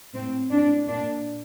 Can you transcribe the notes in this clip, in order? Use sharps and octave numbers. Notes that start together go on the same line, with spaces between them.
A2 C4
A2 D4
A#2 D4